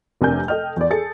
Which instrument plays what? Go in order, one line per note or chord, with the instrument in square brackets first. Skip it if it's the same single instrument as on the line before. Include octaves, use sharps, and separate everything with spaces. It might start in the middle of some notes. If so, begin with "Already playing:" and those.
[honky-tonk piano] F1 C3 D4 A#4 G#5 G6
A4 D#5 G5 F6
E2 D5
G#4 A4 A6 C#7